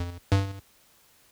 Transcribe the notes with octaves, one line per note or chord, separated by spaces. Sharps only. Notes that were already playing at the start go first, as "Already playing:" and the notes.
Already playing: F2
G2